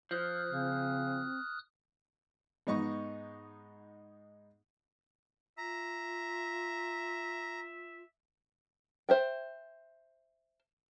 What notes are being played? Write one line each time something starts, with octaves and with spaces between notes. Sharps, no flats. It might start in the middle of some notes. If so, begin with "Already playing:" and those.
F3 D#6 F6 F#6
C#3 C4
G#2 B3 D#4 D#5 C#6
F4 E5 A#5
C5 E5 G5